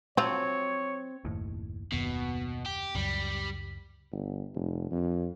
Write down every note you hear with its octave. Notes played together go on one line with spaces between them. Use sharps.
F3 F#3 C4 F4 C#5
F#1 D#2 A2
F#1 D#2 B2
G4
C#2 F#2 G3
G1
F1
F2